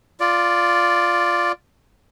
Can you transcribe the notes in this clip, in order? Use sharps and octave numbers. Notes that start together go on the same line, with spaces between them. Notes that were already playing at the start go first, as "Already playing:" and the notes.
F4 D5